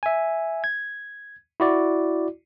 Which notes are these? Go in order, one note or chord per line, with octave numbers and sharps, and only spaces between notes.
E5 G#5
G#6
E4 F#4 D5